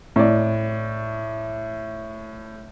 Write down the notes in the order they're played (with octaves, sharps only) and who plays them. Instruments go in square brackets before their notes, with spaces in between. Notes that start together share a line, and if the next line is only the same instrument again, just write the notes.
[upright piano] A2 D5